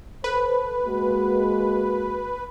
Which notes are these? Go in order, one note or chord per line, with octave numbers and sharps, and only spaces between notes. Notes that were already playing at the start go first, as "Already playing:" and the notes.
A4 B4 C5
G#3 A#3 F#4